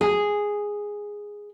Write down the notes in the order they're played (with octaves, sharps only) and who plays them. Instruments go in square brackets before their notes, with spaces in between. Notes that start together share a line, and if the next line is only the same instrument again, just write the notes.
[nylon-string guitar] G#4